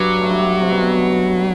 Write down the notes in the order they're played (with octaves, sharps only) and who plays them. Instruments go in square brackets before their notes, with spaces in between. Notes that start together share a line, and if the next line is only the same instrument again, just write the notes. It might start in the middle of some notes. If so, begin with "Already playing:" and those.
Already playing: [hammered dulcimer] G2 G3 [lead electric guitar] F#3
[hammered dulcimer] A3
G2 G3
C3
B2